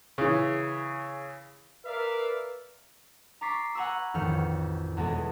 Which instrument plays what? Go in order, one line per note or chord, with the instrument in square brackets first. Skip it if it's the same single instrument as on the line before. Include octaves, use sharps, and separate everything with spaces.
[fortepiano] C#3 E3
[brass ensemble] A#4 B4 D5 E5 F5
[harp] A#5 C#6 D6 A6 B6 C7
F#5 G#5 A#5 B5 C#6 E6
A1 F2 D#3 F6 C#7
E2 B2 G#3 G#4 A4